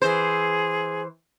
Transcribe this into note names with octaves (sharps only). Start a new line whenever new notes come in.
E3 G#4 C5